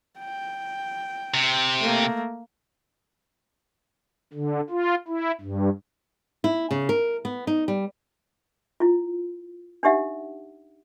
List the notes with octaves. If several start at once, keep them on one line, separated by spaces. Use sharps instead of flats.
G5
C3
A3 A#3
D3
F4
E4
G2
E4
C#3
A#4
B3
D#4
G3
E4 F4
D4 D#4 G4 E5 F#5